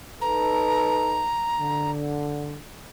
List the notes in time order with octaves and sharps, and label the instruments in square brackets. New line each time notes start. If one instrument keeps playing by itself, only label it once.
[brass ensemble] D#4 A4 B4 [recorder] A#5
[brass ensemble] D3